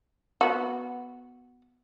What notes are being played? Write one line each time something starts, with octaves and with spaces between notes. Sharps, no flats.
B3 F#4